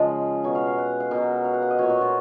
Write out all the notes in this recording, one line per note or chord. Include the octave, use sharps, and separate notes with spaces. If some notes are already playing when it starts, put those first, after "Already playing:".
Already playing: C#3 F3 G#3 D#5
B2 F#3 C#5
F5
F5
F#5
F5
B2 F#3 A#4
F5
F#5
F5
D#5
A#2 F#3 C#5
F#4
F4